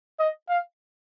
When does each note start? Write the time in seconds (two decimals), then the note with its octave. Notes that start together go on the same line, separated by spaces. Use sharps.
0.19 D#5
0.49 F5